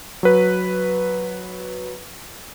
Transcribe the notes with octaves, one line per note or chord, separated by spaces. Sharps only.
F#3 B4